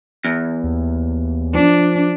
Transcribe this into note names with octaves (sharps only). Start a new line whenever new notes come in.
E2
D#2
F3 D4